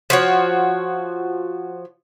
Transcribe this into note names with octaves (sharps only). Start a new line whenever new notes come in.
F3 F#4 C#5